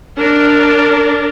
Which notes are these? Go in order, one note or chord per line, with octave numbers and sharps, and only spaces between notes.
D4 A#4